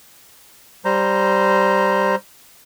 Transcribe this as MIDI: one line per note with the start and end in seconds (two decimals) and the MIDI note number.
0.85 2.15 55
0.85 2.15 72
0.85 2.15 82